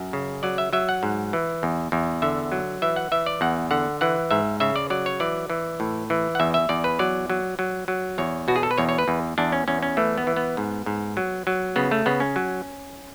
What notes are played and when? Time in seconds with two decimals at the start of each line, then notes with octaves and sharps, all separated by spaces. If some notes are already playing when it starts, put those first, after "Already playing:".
Already playing: F#2
0.13 C#3
0.43 F#3 D5
0.58 E5
0.73 F#3 E5
0.89 F#5
1.03 G#2
1.33 E3
1.63 E2
1.92 E2
2.22 D3 E5
2.52 F#3
2.82 E3 E5
2.96 F#5
3.12 E3 E5
3.26 D5
3.41 E2 F#5
3.71 D3 F#5
4.01 E3 F#5
4.31 G#2 E5
4.60 C#3 E5
4.76 D5
4.90 F#3 D5
5.06 C#5
5.20 E3 D5
5.50 E3
5.80 A2
6.10 E3
6.35 F#5
6.40 E2 E5
6.54 E5
6.69 E2 D5
6.84 B4
6.99 F#3 D5
7.30 F#3
7.59 F#3
7.88 F#3
8.18 E2 C#5
8.48 B2 F#4
8.56 G#4
8.63 A4
8.71 B4
8.78 E2 C#5
8.89 C#5
8.98 B4
9.08 E2
9.38 E2 D4
9.52 C#4
9.68 E2 C#4
9.83 C#4
9.97 E3 A3
10.18 B3
10.27 E3
10.36 B3
10.57 G#2
10.86 G#2
11.17 F#3
11.47 F#3
11.76 C#3 B3
11.91 A3
12.06 C#3 B3
12.20 C#4
12.36 F#3